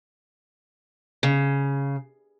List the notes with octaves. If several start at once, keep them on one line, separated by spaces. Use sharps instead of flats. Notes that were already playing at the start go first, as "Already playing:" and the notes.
C#3